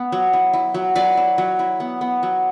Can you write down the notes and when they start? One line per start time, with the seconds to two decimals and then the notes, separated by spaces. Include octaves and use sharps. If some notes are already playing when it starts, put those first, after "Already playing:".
Already playing: B3
0.12 F#3
0.33 E4
0.53 E4
0.74 F#3
0.95 F#3 B4 D5
1.17 E4
1.38 F#3
1.59 E4
1.80 B3
2.01 B3
2.23 F#3